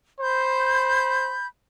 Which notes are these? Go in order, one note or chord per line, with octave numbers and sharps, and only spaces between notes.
C5 B5 G6